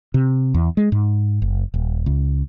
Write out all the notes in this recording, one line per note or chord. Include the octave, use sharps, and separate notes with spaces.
C3
E2
G#3
G#2
F#1
D#1
C#2